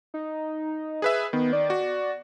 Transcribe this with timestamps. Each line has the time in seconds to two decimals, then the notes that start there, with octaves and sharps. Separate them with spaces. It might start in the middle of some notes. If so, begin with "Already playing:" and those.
0.14 D#4
1.02 G#4 B4 E5
1.33 D#3 B3
1.53 D5
1.70 F#4